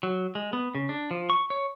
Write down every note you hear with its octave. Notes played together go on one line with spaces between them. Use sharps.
F#3
G#3
B3
C#3
D4
F3
C#6
C#5